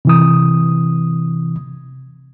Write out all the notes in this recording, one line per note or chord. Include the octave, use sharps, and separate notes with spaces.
C3 E3 D#6